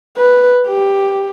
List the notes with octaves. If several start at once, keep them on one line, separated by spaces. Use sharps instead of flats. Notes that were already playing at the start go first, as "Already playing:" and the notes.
B4
G4